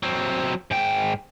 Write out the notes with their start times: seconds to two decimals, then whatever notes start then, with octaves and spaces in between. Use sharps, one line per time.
0.03 F#3 C4
0.71 G#2 G5